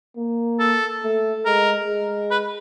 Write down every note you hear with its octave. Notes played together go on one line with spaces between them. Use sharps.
A#3
A4
A3
G#3 A#4
G#3
B4